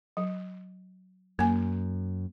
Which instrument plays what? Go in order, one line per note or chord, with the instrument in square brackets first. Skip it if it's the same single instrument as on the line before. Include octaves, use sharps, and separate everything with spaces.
[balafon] F#3
[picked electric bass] F#2 [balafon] A#3 G#5